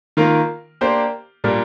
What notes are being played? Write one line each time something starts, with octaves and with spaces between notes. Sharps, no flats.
D#3 A#3 F4 A#4
A#3 D4 G4 C5
A#2 G3 A#3 D4